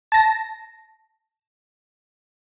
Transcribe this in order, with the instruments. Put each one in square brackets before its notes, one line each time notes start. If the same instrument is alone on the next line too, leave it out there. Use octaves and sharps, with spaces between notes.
[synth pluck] A5 A#6